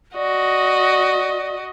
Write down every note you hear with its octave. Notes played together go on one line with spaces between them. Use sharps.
F#4 D5 D#5